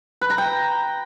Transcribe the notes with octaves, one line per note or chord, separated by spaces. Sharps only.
B4
A#5
G5